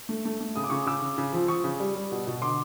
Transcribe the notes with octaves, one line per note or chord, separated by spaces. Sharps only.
A3
A3
A3
C#3 D#6
D6
C#3 C#6 D#6
C#3 D6 E6
C#3
C#3
F3
F3 C#6 D#6
C#3
G3
G3
B2
B2
D3 C6 D6